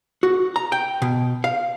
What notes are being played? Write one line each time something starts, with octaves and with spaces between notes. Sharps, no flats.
F#4
A#5
G5
B2
F5